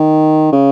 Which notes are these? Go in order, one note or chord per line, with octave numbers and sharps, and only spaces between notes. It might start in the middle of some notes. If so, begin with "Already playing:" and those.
Already playing: D#3
C#3